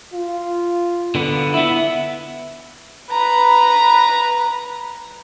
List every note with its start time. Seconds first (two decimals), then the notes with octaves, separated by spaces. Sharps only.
0.14 F4
1.15 D3 B3
1.54 B3 E4 E5
3.10 B4 A#5